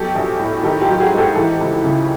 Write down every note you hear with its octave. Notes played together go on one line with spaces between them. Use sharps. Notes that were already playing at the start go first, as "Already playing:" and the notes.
Already playing: B2 F#3 G4 A4
A#1
A2
D#3 G4 A4
F4 G4
F#3
F#4 G#4
G#2
G4 A4
E3 G4 A4
C#2
C#3